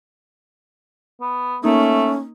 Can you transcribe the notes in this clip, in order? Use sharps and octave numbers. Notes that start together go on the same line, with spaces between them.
B3
A3 A#3 C#4 D#4